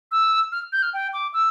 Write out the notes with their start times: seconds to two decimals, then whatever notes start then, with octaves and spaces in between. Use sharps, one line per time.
0.12 E6
0.52 F6
0.72 G6
0.83 F6
0.93 G5
1.13 D6
1.34 E6